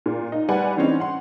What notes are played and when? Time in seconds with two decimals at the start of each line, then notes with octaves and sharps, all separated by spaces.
0.06 A#2
0.32 D#4
0.49 G3 B4 D5 F#5 G#5
0.77 E3 C4 C#4 D#4
1.00 F#5 C6